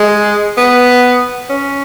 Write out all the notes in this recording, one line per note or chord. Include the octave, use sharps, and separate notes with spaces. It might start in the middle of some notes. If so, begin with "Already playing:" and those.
Already playing: G#3
B3
C#4